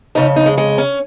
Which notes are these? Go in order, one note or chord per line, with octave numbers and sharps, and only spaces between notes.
F2 C#3 D#4
D#4
G#3
G#3
C#4